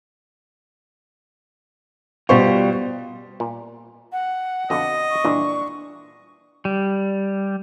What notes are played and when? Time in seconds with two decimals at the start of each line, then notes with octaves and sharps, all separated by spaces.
2.29 B2 G3 F4 C5 C#6
3.40 A#2
4.12 F#5
4.70 F2 B2 D3 D#5
5.10 C#6
5.24 A#2 E3 D4
6.65 G3